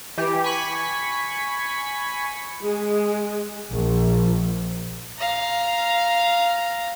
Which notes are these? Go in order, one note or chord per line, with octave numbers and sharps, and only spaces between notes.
E3 G4
G#5 B5 C#6 B6
G#3 G#4
A#1
F5 A#5